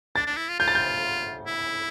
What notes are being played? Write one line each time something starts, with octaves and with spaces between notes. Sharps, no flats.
D4 A6
D4
E4
F4
F4 G6
A6
G6
E4